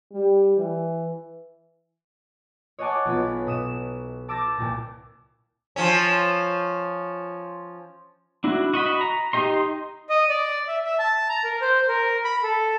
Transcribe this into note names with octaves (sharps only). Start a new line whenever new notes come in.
G3
E3
C#5 D#5 F#5 G#5 A5 D6
B1 B3 F4 B5
B2 D#6 E7
A5 D6 E6 G6 A6 A#6
C2 A#2
F3 C#4
D4 E4 F#4
F#4 D#5 B5
A#5
D#4 G4 D#5 C6
D#5
D5
E5
E5
A5
A#5
A#4
C5
A#4
B5
A4